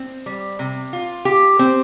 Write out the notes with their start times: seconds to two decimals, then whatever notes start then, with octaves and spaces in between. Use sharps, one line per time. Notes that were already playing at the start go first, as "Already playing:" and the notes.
Already playing: C4
0.26 G3
0.59 C3
0.93 F4
1.25 G4
1.59 C4